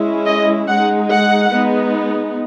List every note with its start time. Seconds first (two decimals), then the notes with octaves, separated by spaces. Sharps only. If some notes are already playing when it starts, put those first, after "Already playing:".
Already playing: G#3 C#4 E4
0.26 D#5
0.68 G#3 D#4 F#5
1.11 F#5
1.53 G#3 B3 D#4